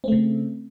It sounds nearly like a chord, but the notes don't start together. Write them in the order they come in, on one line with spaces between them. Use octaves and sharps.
C4 A3 C#3